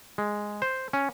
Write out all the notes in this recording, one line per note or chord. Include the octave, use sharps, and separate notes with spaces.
G#3
C5
C#4